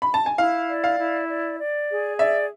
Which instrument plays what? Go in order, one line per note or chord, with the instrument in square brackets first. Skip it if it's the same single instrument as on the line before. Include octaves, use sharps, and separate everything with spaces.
[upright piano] B5
A5
G#5
[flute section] E4 [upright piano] F5
[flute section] D5
[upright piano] F5
[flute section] E4
D5
D5
G#4
[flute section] D5 [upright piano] E5